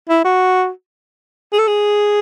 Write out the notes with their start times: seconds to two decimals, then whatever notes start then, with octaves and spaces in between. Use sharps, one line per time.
0.09 E4
0.24 F#4
1.53 G#4
1.59 A4
1.67 G#4